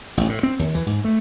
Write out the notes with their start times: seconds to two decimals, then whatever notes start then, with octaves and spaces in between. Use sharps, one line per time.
0.17 A1
0.29 A2
0.43 C4
0.59 D#2
0.75 E3
0.86 G#2
1.05 A3